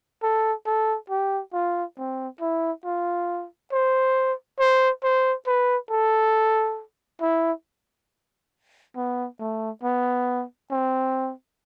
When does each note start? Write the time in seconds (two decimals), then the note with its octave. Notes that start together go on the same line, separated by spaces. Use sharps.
0.22 A4
0.66 A4
1.10 G4
1.53 F4
1.98 C4
2.41 E4
2.85 F4
3.72 C5
4.59 C5
5.03 C5
5.47 B4
5.90 A4
7.21 E4
8.96 B3
9.40 A3
9.83 B3
10.71 C4